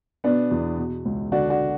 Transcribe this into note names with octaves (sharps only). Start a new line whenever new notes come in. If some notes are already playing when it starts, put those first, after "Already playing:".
B2 B3 D4
E2
B2
C#2
D3 D4 F#4
D4 F#4